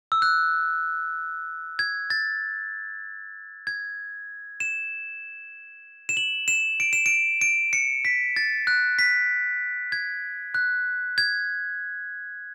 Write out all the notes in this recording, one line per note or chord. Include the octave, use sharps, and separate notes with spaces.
E6
F#6
G#6
A6
G#6
E7
E7
F#7
E7
D7
E7
D7
D7
C#7
B6
A6
F#6
B6
G#6
F#6
G#6